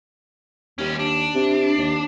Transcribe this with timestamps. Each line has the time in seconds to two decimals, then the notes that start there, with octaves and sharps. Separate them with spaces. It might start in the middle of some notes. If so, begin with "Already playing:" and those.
0.78 D#2 G3 C#4
0.99 D4
1.35 C3
1.78 D#2